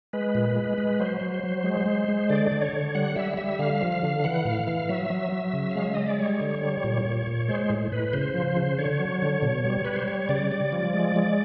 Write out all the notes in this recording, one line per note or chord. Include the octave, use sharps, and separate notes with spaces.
G#3 B4
A#2
G#3
G#3
F#3 C5
F#3
F#3
G#3
G#3
G#3
D3 D5
D3
C#5
D3
G3 F#5
G3 E5
G3 E5
D3 F5
F3
F5
D3
E3 F#5
A2 F5
E3 F5
F#3 E5
F#3
F#3
C#3
G#3 F5
E5
G#3 D#5
D5
G3 C#5
D3
G3
A#2
A#2
A#2
G#3 C5
A2
A2 B4
C#3 C5
F3
C#3
D3 C#5
F#3
D3
B2
G3
G3 B4
C5
G3 C#5
C#3 D5
G3 D5
F3
G#3
G#3